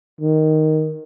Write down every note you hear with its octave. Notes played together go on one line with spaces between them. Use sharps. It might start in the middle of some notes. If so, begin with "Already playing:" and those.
D#3